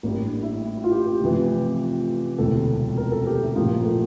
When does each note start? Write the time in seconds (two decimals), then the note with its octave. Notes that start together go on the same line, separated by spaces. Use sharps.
0.03 A1 A2 G3 A#3
0.23 D4
0.43 E4
0.62 E4
0.77 E4
0.84 F4
0.92 G4
1.06 G4
1.21 F1 F2 E3
2.38 E1 D2 C3 A4
2.98 A#4
3.12 A4
3.26 G4
3.41 E4
3.56 A#1 A#2 F3 A3
3.70 A#3
3.85 A3